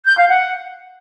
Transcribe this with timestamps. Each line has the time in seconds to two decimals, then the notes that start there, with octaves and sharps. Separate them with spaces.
0.06 G6
0.17 F5
0.28 F#5